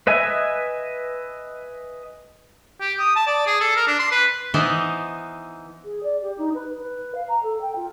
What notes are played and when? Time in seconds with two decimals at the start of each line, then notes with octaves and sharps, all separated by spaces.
0.07 B4 D#5 E5 G#5
2.80 G4
2.99 D#6
3.16 A5
3.27 D5
3.47 G#4
3.60 A4
3.76 A#4
3.87 D4
3.99 C6
4.11 B4
4.54 E3 B3 D#4 C5
5.85 G#4
6.03 D5
6.22 G4
6.38 D#4
6.54 B4
6.79 B4
7.15 F5
7.28 A#5
7.43 A4
7.61 G5
7.75 F4